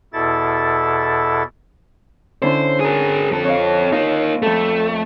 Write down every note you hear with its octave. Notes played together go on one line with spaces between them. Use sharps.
E2 B2 E4 A4 A6
D3 C#4 E4 C5
G#4 A#4
F2 A4
C#5 D#5 F5
A#3 D#4 F4
F2 A3 A4